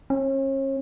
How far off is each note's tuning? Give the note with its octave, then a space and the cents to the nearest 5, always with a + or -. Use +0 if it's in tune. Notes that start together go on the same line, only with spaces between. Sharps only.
C#4 -40